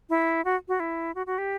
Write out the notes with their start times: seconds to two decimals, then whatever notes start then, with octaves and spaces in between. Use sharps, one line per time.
0.10 E4
0.45 F#4
0.68 F#4
0.80 E4
1.15 F#4
1.26 F#4
1.38 G4